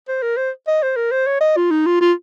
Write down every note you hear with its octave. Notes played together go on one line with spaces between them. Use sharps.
C5
A#4
C5
D#5
C5
A#4
C5
C#5
D#5
F4
D#4
F4
F4